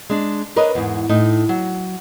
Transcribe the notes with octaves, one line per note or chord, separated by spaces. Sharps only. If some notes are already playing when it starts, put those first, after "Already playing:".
G#3 D4
D4 A#4 B4 C#5 D#5
E2 G#2
A2 D#4
F#3